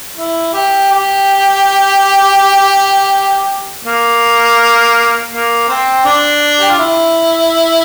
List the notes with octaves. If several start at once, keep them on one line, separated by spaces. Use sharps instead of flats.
E4
G4
G4
A#3
A#3
C4
D4
G4
F4
E4